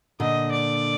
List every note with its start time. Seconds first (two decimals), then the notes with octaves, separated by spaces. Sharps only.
0.20 A#2 D3 D#5
0.51 D5